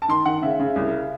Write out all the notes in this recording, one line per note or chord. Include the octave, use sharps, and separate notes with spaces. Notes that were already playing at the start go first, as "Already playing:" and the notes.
A5
D#3 C6
D#3 F#5
C#3 E5
C#3
C2